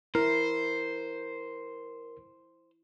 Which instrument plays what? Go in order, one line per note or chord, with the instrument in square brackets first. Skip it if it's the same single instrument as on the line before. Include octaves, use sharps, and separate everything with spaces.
[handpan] E4 [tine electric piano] A#4 [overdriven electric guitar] C5